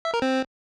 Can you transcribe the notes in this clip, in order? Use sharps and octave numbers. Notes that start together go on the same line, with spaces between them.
E5
A#4
C4